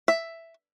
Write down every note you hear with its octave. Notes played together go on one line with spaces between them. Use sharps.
E5